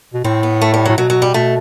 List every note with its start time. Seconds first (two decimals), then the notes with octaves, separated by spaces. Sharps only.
0.14 B2
0.24 A2 C4
0.43 B3
0.62 A3
0.74 G3
0.85 A2 F#3
0.98 B2 F#3
1.10 F#3
1.22 G3
1.34 B2 A3